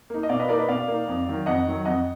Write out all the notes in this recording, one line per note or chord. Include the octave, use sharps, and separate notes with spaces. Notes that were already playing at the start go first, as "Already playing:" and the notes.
A#3 D#4
D#5
B2 D5 F5
B4 D#5
A#3 D#4 A#4 D5
B4 D#5
B2 D5 F5
A#3 D#4
F2
D#3 F#3
F2 D#5 F#5
D#3 F#3
F2 D#5 F#5